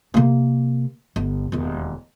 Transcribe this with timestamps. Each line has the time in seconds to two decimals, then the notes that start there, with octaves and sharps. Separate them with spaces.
0.14 C3 A#3
1.16 G1
1.52 E1 D#2